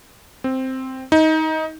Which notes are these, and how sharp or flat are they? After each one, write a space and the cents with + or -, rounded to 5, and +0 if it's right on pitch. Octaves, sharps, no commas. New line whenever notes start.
C4 +0
D#4 +20